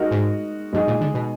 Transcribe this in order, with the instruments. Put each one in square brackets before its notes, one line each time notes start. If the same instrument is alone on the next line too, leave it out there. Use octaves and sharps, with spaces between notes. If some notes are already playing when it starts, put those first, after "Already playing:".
Already playing: [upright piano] G#3 D#4 F#4 A#4
[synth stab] G#2
[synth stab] F#2 [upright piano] G#3 D#4 G#4
[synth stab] A#2
D3
B2